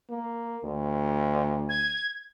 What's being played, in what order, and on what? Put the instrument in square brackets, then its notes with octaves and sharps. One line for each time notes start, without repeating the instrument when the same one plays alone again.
[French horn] A#3
D2
[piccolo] G#6